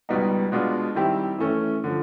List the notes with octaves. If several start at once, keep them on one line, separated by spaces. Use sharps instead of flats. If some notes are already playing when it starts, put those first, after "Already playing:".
C#2 B2 G3 B3 D#4
B2 G#3 B3 D4 F4
D#3 G3 C4 E4 G4
E3 A3 C#4
D3 F3